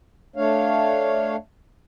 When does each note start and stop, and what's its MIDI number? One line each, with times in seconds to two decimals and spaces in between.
0.36 1.36 57
0.36 1.36 62
0.36 1.36 73
0.36 1.36 77